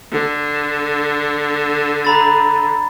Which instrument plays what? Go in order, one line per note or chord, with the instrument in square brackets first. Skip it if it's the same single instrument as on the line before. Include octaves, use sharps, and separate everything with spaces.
[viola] D3
[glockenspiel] A#5 B5 A6